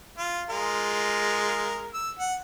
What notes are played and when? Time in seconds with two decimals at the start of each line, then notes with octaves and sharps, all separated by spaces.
0.18 F4
0.49 G#3 F4 A#4
1.94 E6
2.19 F#5